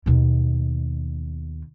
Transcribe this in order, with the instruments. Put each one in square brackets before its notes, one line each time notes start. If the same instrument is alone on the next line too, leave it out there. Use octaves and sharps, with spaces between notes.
[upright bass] D#2 B2